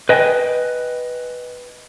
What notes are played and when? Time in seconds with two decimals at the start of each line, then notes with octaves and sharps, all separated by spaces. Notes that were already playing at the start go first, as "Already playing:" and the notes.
0.09 B4 D#5 G5 G#5